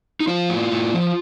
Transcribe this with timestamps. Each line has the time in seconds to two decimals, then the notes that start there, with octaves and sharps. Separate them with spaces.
0.20 D#4
0.27 F3 F4
0.49 A2
0.71 A2
0.94 F3